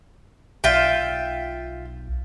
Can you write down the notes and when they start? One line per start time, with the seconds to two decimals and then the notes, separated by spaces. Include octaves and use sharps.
0.64 B1 F4 E5 G5